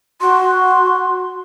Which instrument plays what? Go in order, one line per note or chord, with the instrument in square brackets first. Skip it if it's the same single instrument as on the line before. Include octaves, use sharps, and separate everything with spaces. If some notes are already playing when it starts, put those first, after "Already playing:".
[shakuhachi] F#4 [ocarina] C6